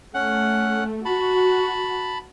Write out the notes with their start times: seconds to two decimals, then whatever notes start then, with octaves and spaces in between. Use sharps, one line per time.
0.14 A3 C#4 F#5
1.05 F#4 A5 B5